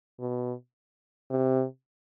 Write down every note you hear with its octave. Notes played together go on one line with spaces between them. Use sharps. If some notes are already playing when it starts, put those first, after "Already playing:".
B2
C3